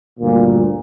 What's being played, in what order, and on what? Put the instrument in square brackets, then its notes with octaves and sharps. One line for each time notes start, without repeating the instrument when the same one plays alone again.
[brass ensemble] D2 G2 A#2